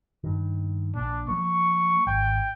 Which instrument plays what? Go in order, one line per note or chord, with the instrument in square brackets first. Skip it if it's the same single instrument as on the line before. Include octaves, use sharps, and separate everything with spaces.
[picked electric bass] G2 D#3
[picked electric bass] A#1 A#2 [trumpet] D4
[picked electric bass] F3 F#3 A#3 [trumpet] C#6
[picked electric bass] G#1 [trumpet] G5